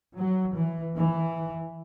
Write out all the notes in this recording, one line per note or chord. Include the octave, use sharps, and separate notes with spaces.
F#3
E3
E3